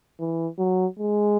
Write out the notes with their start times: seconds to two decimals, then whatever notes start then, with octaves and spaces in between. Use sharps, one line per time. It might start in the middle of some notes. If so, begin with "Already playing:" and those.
0.20 E3
0.59 F#3
1.00 G#3